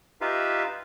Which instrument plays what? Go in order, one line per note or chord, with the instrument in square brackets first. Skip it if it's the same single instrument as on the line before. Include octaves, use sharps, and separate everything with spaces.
[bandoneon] D#4 F4 G4 B4 E5 F5